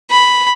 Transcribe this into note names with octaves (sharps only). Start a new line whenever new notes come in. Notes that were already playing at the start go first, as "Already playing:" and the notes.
B5